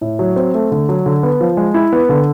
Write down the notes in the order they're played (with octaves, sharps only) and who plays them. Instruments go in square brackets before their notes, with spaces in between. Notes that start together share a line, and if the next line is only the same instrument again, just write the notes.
[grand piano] A2
F#3
C4
A3
D3
F#3
D3
B3
F3
G#3
E4
B3
D3